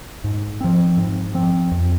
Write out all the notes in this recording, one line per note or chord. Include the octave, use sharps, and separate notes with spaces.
G#2
F3 C4
G#2
F3 C4
F2